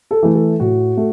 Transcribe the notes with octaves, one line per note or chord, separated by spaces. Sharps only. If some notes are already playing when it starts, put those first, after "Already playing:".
A4
E3 A3
A4
A2 F#4
A3